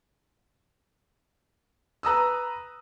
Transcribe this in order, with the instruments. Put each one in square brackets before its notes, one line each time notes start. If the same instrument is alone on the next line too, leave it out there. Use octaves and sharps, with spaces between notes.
[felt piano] B4 A#5 D#6 E6